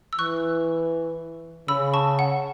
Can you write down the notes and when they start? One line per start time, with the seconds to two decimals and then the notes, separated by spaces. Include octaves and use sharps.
0.13 E6
0.18 E3 C#6 F#6
1.68 C#3 B5 E6
1.94 A5 C#6
2.19 F#5